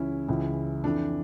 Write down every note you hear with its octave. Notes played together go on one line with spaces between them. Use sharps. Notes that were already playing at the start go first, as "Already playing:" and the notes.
Already playing: C#2 C#3 E3 C#4 E4
C#2 C#3 E3
F2 E3 D4